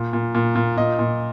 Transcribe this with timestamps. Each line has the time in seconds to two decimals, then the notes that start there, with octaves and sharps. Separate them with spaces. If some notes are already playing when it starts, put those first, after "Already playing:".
Already playing: A#2
0.13 A#2
0.35 A#2
0.55 A#2
0.77 A#2 D#5
0.99 A#2